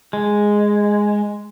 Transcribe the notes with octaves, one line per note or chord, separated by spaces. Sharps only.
G#3